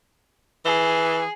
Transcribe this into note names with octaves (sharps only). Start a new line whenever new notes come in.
E3 G#4